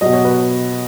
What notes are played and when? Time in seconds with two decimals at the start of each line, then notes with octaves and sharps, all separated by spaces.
0.01 B2 F#3 D#5
0.13 C#5
0.25 B4